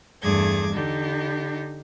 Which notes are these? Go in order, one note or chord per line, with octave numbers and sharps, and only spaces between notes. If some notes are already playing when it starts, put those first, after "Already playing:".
E2 G2 A3 G#4 D6 G#6
D3 D#4 G4